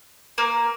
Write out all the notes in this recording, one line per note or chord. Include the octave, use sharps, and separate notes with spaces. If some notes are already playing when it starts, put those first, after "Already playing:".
A#3